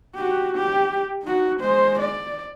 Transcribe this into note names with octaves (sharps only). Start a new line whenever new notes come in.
F#4 G4
G4
D#4 F#4
G#3 C5
D5